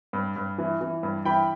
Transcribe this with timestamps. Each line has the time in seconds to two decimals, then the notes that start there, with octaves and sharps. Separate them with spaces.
0.13 G2
0.36 G2
0.58 E3
0.81 E3
1.03 G2
1.25 E3 G5 B5